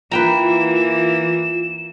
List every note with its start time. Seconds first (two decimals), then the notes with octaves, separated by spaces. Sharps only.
0.11 E3 A#3 F4 B4 G5 A#5 E7